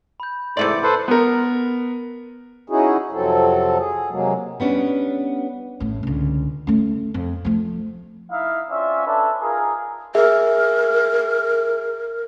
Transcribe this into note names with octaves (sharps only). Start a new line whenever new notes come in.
B5 G6
G#2 C3 E3 A3 D5 C6 A6 C#7
A4 B4 C5
B3 A#4
C#4 D#4 E4 F#4 G#4
F2 C3 F#3 C4 A4
G#4
C3 F#3 G#3 A#3
G3 B3 C#4 D4
A1 A2
C#2 D3
A3 C#4
F2
F3 A3
D#4 E4 E5 F5
C4 C#4 F4 D5 E5
C#4 D4 A4 B4 E5
D#4 F4 G#4 A#4
G#4 A#4 E5